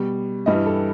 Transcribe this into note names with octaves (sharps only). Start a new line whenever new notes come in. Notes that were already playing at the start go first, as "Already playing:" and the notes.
Already playing: B2 G3
G2 E3 G3 D#5
A4